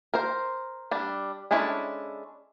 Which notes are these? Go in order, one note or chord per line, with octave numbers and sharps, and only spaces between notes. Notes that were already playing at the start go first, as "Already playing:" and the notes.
A#4 C5
G3 D4
G#3 C#4 D4 E4 A4